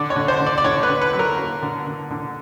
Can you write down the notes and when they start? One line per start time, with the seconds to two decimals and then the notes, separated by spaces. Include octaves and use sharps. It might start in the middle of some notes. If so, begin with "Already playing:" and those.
Already playing: D3 D5
0.10 C#5
0.16 D3
0.28 C5
0.40 D3
0.46 D5
0.58 D5
0.64 D3 C#5
0.83 B4
0.89 D3
1.01 B4
1.13 F#3
1.19 A#4
1.37 A#3
1.63 D3
1.86 D3
2.11 D3